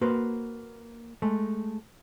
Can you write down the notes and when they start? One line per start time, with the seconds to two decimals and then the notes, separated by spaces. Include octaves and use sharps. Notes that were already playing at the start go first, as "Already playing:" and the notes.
0.01 A#3 F#4 B4 C5
1.22 G#3 A3